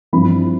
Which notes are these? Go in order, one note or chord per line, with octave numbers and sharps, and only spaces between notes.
G2 F3 C4 E4 B5